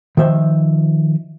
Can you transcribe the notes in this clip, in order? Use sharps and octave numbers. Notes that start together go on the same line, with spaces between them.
D#3 F3 E5 G5